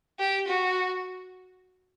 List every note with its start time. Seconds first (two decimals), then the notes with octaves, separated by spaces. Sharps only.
0.19 G4
0.48 F#4